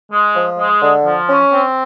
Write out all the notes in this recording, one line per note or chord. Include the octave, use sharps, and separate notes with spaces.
G#3
F3
G#3
D3
F3
C#4
C4